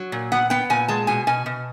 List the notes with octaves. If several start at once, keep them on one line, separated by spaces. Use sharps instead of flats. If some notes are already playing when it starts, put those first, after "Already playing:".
Already playing: F#3
A#2
B3 F#5
B3 G5
A#2 G#5
G#3 A5
B2 G#5
B2 G#5
B2